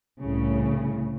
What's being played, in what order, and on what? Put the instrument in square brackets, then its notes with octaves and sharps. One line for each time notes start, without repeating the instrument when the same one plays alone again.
[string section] C2 A2 C#3